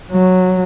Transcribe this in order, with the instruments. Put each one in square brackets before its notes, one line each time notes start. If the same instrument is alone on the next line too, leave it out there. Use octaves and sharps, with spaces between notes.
[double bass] F#3